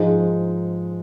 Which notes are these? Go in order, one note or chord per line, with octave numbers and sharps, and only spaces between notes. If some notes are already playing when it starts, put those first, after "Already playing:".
Already playing: G#2 F3 G#3 D#4